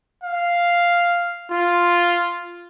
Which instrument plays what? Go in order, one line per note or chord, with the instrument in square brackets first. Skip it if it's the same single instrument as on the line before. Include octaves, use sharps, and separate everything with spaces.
[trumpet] F5
F4